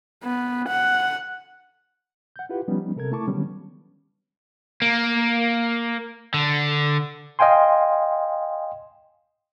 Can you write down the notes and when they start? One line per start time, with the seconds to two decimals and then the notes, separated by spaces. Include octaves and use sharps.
0.24 B3
0.68 F#5
2.36 F#5 G6
2.49 E4 F4 G4 B4 F#5
2.68 F3 G3 B3 C#4 D#4
2.96 C3 A4 A#4 G#6
3.12 A3 E4 A5 C#6 D6
3.27 D3 D#3 F#3 G3 B3 C#4
4.82 A#3
6.34 D3
7.39 D#5 F5 G5 G#5 C6